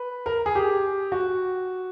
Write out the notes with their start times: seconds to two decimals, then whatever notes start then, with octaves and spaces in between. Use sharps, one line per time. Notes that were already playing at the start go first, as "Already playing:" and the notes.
Already playing: B4
0.26 A#4
0.46 G#4
0.55 G4
1.12 F#4